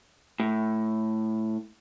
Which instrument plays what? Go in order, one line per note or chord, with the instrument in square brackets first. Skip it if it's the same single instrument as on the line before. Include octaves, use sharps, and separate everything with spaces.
[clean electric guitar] A2